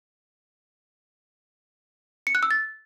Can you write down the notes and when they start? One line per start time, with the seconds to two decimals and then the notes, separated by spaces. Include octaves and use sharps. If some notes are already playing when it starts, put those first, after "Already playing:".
2.27 C#7
2.35 F#6
2.43 E6
2.51 A6